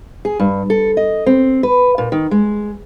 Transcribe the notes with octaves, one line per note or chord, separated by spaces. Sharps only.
G#4
G2
A4
D#5
C4
B4
A#2
D#3
G#3